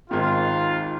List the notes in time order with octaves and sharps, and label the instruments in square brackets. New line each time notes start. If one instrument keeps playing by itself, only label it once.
[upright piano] G#1 G#2 D#3 [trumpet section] F4